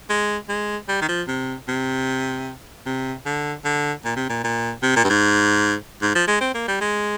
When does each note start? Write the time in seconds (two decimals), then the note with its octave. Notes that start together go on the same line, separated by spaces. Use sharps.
0.10 G#3
0.49 G#3
0.88 G3
1.01 D#3
1.08 F3
1.28 C3
1.68 C3
2.86 C3
3.26 D3
3.65 D3
4.05 A#2
4.16 C3
4.29 A#2
4.44 A#2
4.83 C3
4.96 A#2
5.04 G2
5.10 G#2
6.02 G#2
6.15 F3
6.28 G#3
6.41 C4
6.54 A#3
6.68 G3
6.81 G#3